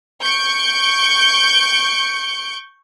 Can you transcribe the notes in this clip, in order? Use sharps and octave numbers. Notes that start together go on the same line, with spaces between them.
C#6 G6 C#7 D7